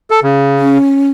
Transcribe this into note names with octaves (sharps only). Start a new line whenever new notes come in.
A4
C#3
C#4